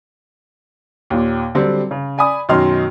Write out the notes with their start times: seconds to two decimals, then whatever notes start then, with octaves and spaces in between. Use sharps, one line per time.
1.10 D#2 A#2
1.55 D3 F#3 G3 C4
1.91 C#3
2.18 D5 G#5 B5 D#6
2.49 F#2 B2 D#3 D#5 C6 F6